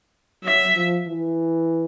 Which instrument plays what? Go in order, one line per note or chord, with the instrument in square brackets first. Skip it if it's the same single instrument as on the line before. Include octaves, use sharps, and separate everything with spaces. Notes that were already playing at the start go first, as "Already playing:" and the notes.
[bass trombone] F#3 [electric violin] E5
[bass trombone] F3
E3